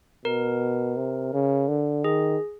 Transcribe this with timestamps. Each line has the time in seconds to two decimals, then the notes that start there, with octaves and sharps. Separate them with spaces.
0.25 B2 A#4
0.96 C3
1.33 C#3
1.68 D3
2.04 D#3 G#4